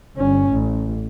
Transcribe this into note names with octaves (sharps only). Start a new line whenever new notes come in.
G1 C#4
A1